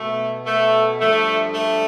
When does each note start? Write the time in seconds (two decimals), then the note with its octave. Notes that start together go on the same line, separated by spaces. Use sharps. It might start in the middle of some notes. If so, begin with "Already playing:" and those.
Already playing: B2 A3
0.46 A3
1.00 G2 D3 F3 A3
1.53 A3